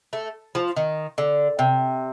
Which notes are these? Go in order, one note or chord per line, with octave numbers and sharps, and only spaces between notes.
A3
F3
D#3
D3
C3